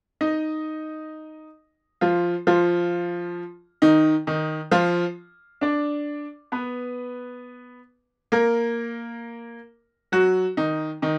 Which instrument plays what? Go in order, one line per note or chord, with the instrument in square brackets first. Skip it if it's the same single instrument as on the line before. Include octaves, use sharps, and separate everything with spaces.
[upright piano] D#4 D#5
F3 F4
F3 F4
D#3 D#4
D#3 D#4
F3 F4
D4 D5
B3 B4
A#3 A#4
F#3 F#4
D#3 D#4
D#3 D#4